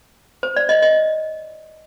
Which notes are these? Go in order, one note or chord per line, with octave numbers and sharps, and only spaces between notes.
C5
D5
D#5
D#5